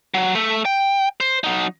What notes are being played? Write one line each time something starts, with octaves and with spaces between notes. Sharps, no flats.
F#3
A3 E5
G5
C5
F#3 D#4